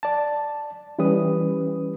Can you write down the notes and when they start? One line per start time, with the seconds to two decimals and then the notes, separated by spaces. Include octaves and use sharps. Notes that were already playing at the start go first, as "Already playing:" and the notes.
0.03 D5 A5
0.99 E3 G3 C#4 B4 D#6